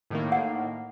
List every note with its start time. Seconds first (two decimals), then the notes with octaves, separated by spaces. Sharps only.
0.10 A2 D#3 A#3
0.32 F#5